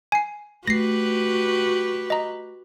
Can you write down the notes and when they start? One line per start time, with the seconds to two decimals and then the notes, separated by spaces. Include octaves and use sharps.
0.12 G#5 C7
0.67 A3 F#4 G4 B4 A#6 C7
2.10 D#5 A#5